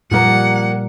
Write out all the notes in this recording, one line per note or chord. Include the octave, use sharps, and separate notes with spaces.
A#2 F3 G3 A#3 A#4 F#5